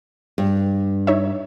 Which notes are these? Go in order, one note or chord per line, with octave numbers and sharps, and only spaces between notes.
G2
D#4 C#5 E5